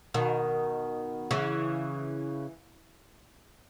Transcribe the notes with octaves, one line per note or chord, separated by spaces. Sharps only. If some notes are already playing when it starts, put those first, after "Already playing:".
B2 D#3
C#3 E3